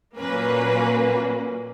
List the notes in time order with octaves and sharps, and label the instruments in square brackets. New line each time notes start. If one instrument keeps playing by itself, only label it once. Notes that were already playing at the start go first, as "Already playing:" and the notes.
[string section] A#2 F#3 A#3 C#4 B4